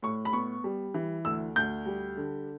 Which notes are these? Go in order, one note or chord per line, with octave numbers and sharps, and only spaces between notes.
A2 C#6
B5
B3 C#6
G3
E3
D2 E6
D2 G6
G3
D3